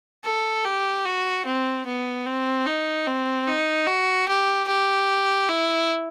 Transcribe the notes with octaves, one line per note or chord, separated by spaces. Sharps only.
A4
G4
F#4
C4
B3
C4
D#4
C4
D#4
F#4
G4
G4
E4